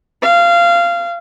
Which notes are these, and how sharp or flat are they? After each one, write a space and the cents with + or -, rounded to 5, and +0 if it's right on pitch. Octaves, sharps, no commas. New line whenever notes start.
F5 -20